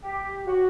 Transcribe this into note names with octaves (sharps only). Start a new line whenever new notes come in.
G4
F#4